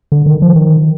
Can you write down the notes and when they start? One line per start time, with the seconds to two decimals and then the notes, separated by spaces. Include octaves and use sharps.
0.12 D3
0.26 D#3
0.42 F3
0.56 D#3